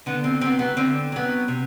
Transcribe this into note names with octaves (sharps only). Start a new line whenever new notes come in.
D3 B3
C4
F#3 B3 C4
B3
D3 C4
F#3 B3
C3